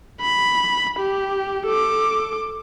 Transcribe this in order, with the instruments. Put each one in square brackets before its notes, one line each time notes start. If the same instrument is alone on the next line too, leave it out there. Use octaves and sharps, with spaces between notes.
[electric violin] B5
G4
A4 D6